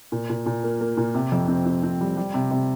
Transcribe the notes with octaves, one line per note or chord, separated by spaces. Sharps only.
A#2
A#2
A#2
A#3
A#3
A#2
C3
F2
C4
C4
C4
G3
G3
C3
C3